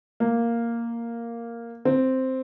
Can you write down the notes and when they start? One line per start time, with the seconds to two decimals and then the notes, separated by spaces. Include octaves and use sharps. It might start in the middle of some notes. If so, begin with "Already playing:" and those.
0.20 A#3
1.85 C4